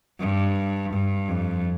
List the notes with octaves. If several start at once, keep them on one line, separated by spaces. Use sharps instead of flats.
G2
G2
F2